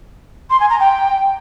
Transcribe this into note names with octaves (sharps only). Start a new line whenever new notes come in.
C6
G#5
A#5
G5